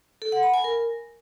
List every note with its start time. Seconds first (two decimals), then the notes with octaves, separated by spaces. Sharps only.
0.22 A4
0.32 F#5
0.43 B5
0.54 G#5
0.64 A#4